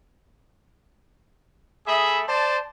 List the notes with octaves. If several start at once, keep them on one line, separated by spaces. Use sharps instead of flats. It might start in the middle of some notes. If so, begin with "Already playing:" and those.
A3 G#4 E5 B5 D#6
C5 D5 A5